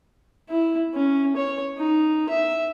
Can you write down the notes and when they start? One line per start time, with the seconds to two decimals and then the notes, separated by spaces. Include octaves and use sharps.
0.49 E4
0.94 C#4
1.36 C#5
1.77 D#4
2.29 E5